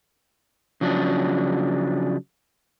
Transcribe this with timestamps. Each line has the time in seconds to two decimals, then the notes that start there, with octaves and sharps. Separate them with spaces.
0.81 C#3 F3 F#3 D4